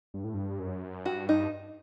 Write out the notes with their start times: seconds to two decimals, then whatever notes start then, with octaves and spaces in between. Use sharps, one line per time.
0.14 G2
0.24 A2
0.34 G2
0.59 F#2
1.06 G2 F#4
1.29 D#4